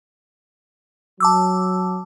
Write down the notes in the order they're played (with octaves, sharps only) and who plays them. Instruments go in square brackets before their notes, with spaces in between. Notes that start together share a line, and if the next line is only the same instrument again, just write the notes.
[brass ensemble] F#3 [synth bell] A5 D6 E6